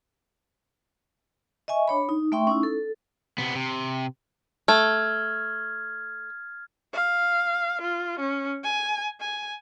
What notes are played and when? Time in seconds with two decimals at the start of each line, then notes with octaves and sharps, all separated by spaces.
1.68 D#5 E5 G#5 C#6
1.88 D4 C#5 B5
2.09 D#4
2.32 A3 E5 G5 C6 C#6
2.47 C#4 D#4 E4
2.63 A4
3.38 C3 B3
3.55 C3
4.68 A3 F6 G#6
6.94 F5
7.82 F4
8.20 C#4
8.64 G#5
9.21 G#5